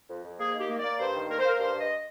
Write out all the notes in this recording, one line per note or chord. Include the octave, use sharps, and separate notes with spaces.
F2
F2
A#3 G#4
D#3 G4
A#3
A#3 D5
G2 C5
D#3
A#3 A#4
C5
A#3 A#4
G2 C5
G2
D#5